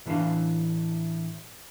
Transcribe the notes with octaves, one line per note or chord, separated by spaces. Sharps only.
A2 E3 F#3 D4 F5